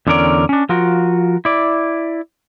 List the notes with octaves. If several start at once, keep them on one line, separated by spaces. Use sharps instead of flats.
E2 D3 C#4 A#4 D5
C#4 D4
F3 F4 F#4 A#4
E4 D5